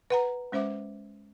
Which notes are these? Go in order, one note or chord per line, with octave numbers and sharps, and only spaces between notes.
B4 F#5 A#5
G#3 C#4 C5 E5 D6